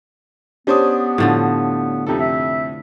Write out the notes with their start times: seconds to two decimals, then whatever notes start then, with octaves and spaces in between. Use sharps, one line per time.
0.67 B3 C#4 D4 G4 C5 D#6
1.18 A2 D3 F3
2.07 F2 C3 D#4 A4
2.20 E5